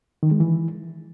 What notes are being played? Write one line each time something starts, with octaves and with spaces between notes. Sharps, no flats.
D#3
G#3
E3